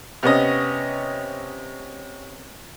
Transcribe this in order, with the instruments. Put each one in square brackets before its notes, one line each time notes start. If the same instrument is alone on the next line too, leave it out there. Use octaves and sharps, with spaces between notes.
[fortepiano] C3 B3 C#4 D#5